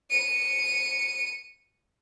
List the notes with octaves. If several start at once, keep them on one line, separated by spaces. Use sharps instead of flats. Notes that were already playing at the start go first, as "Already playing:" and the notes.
C#7 D#7